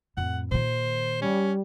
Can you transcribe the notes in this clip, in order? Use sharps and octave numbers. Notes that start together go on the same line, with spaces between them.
F2 A2 F#5
A#2 D#3 C5
G3 C#4